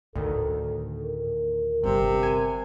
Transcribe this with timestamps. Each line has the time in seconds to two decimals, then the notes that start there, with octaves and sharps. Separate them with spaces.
0.15 D2 A2 D#3 A4
1.02 A#4
1.84 G1 C3 G3 C4
2.23 G#5